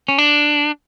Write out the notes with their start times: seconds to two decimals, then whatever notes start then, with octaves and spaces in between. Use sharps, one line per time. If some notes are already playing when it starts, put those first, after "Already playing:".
0.09 C#4
0.18 D4